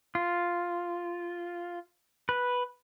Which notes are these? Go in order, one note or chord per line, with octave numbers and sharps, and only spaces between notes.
F4
B4